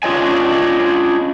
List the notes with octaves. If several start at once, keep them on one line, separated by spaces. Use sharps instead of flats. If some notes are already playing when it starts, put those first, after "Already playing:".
C#4 D4 F4 C#5 D#5 G#5